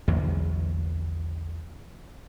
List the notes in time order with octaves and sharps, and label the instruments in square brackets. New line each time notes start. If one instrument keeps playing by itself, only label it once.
[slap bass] A#1 E2 D3 F#3